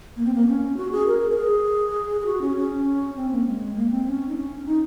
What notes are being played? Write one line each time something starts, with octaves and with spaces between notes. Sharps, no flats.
A#3
C4
A#3
C#4
F#4
G#4
A#4
A#4
G#4
G#4
F#4
C#4
C#4
C4
A#3
G#3
A#3
C4
C#4
D#4
C#4
D#4